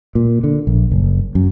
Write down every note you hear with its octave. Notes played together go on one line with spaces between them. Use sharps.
A#2
D3
A#1
F#1
F#2